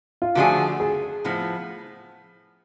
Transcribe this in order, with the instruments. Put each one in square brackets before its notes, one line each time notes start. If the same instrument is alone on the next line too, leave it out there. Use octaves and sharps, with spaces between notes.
[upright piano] F4
[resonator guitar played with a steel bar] D3 F3 A3 D4 G#4 [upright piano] F#4
[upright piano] G#4
[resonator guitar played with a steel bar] A2 F3 B3